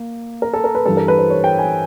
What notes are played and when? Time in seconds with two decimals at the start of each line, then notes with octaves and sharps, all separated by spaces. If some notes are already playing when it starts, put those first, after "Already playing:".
Already playing: A#3
0.42 A#4
0.53 A4
0.64 A#4
0.75 B4
0.86 G2 E3 G3 A4
0.97 A#4
1.08 B4
1.19 C5
1.30 C#5
1.44 G5
1.59 G#5